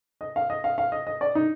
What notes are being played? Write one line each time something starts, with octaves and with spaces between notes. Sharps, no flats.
D#5
F5
D#5
F5
F5
D#5
D#5
D5
D#4